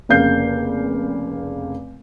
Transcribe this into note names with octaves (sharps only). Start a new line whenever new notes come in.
F1 C#3 A#3 F5 G6 C7